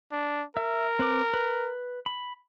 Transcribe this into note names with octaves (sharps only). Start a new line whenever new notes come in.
D4
A#4 E5
C4 B4 D6
B4
B5